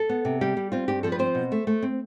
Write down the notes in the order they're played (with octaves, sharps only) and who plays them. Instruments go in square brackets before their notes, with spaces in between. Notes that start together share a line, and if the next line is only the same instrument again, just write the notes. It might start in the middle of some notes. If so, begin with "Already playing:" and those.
Already playing: [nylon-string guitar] A4
B3
C3
G3 G4
G3
C4 F4
G2 G4
F3 A4
B4
C4 C5
B2
A3
A3
C4